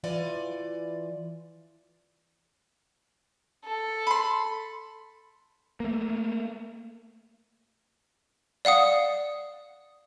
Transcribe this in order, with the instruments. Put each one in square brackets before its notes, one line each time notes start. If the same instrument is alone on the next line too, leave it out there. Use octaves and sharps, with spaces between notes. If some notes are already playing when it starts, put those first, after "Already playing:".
[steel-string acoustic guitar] E3 F4 D5 G#5
[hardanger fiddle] A4
[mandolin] B5 C6
[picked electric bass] A3 A#3
[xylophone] D5 F5 F#5 D#6